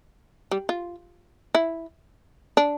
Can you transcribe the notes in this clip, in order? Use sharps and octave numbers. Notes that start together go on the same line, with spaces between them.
G3
F4
E4
D4